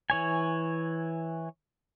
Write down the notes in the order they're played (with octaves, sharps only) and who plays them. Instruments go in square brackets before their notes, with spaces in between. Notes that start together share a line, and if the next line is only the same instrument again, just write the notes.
[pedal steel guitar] E3 C#5 G#5